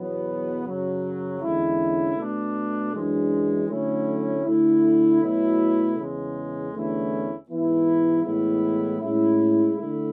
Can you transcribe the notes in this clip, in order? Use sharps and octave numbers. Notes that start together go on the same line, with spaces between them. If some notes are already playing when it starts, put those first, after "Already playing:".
Already playing: E2 B2 F#3 B3
F#2 C#3 F#3
E2 D3 G#3 C#4 E4
B2 A3 D4
F#2 E3 G#3 D4
D3 F#3 A3 C#4 E4
D3 A3 E4
B2 F#3 A3 E4
E2 C#3 G#3
E2 D3 A3 C#4 E4
G#2 E3 B3 E4
A2 E3 G#3 B3 E4
A2 G#3 C#4 E4
D3 A3 E4